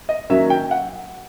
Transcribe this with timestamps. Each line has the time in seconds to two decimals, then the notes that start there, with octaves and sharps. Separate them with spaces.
0.09 D#5
0.30 D#3 F#3 A#3 C#4 E5
0.50 G5
0.71 F#5